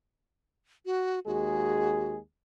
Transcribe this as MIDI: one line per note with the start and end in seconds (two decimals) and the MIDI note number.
0.86 1.19 66
1.27 2.18 39
1.27 2.18 56
1.27 2.13 66
1.27 2.18 68